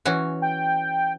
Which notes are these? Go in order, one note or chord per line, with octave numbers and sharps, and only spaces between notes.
E3 C#4 F#4
G5